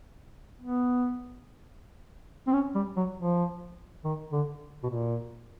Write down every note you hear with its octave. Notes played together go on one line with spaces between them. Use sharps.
B3
C4
C#4
G3
F#3
F3
D#3
D3
B2
A#2